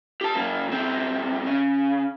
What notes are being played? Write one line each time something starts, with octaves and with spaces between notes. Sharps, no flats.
G4 A5
F#2 A#3
B1 C4
C#3